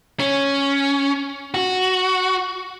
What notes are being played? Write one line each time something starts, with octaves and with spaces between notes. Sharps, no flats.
C#4
F#4